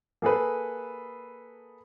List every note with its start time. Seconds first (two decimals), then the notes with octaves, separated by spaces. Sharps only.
0.22 A#3 G#4 A4 B4